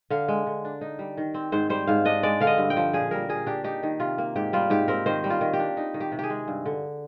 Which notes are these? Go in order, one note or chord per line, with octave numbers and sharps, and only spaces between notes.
D3 F5
G#3
D3
D4
D#4
G3
D#3
C4
G#2 C5
G3 C5
G#2 F5
D4 D#5
G#3 D5
D3 F5
D#5
G2
G5
F3
A#2 G#4
G3 A#4
A#2 G#4
D4 G4
D#4 G4
D#3
C3 F4
A#3
G#2 G4
G3 F4
G#2 G4
C4 A#4
D#3 C5
G3
F4
D#3
G4
D4
D#4
D#3
G4
C3
G4 G#4
G#3
G2
D3